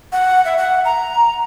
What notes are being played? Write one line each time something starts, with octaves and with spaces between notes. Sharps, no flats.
F#5
E5
F#5
A#5